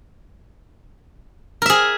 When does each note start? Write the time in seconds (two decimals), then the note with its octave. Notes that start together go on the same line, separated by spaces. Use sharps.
1.62 A#4
1.66 E5
1.70 G#4